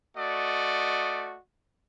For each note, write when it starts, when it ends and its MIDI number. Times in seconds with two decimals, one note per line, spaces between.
0.18 1.39 57
0.18 1.39 66
0.18 1.39 74
0.18 1.39 75